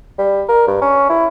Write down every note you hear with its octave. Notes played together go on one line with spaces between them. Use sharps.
G3
A#4
G2
C#4
E4